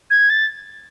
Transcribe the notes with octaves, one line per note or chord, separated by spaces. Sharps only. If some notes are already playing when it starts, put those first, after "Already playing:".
G#6
A6